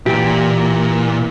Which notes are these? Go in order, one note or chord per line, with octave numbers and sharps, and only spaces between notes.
A#2 E3 G4